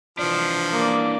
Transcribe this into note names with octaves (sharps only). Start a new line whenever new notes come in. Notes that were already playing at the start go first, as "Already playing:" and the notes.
E3 F3 D4
A#3 D5